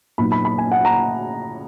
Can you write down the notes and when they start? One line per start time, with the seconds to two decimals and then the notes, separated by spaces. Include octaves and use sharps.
0.18 A#2 F#3 B3 D#4 B5
0.32 B5
0.45 B5
0.58 G#5
0.72 F#5
0.85 A#5